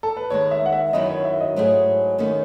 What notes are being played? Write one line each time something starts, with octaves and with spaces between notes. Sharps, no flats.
A4
B4
D#2 D#3 G#3 C#5
E5
F#5
E5
F#2 D#3 F#3 B3 E4 D#5
C#5
E5
D#5
G#2 F#3 A3 E4 G#4
D#2 D#3 A3 C#4